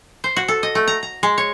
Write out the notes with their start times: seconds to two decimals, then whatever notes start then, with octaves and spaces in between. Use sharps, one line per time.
0.24 C5
0.36 F#4
0.48 A4
0.63 D#5
0.75 A3
0.87 A#5
1.03 A#5
1.23 G#3
1.38 C#5